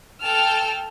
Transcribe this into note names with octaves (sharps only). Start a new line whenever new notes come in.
A4 G5 A5 F6